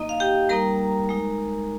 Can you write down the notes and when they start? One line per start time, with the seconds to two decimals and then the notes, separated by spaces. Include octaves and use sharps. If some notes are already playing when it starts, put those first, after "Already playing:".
Already playing: A#3 D#4 D#5
0.09 F5
0.20 G4 G5
0.49 G3 A#3 D#4 A#4 A#5
1.09 G#3 D#4